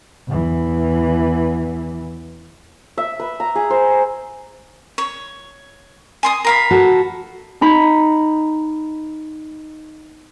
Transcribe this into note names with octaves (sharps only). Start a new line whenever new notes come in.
E2 E3
E5
B4
A#5
G#4
C5
C#5
G#5 C6 D#6
A#4 F5 B5
F#4 A4
D#4 A#5 B5